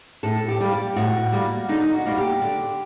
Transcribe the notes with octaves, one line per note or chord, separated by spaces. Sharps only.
A2 A4
G4
G3 A#3
G4
A2 F#4
G3 A#3
D3 D#4
F#4
G3 A#3
G4
D3